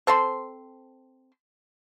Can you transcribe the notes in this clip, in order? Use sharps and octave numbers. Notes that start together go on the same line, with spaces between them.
C4 A4 C5 C6